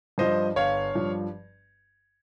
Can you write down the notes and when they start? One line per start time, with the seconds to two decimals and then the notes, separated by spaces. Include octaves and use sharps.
0.18 G2 F3 C5 D#5
0.56 G1 C#5 F5
0.95 G2 F3